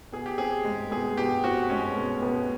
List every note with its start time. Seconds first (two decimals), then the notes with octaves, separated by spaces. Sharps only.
0.13 B2 G#4
0.26 G4
0.38 C4 G#4
0.65 G#3
0.91 B2 G#4
1.17 B2 G4
1.44 C4 F#4
1.69 G#3 C#4
1.96 B2
2.22 B2